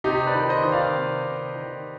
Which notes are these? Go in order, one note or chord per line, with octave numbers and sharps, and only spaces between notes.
C3 D#4 G4
B4 D5
D#3
C5 D#5
D#3 D#5
D5 F5
C3
C3
D#3